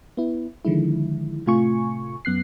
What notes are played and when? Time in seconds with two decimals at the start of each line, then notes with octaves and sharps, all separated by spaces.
0.17 B3 E4
0.65 D3 D#3 F3 G#3 E4
1.46 A2 C3 A3 F4 G#5 C#6
2.25 F#2 B3 F#6 C7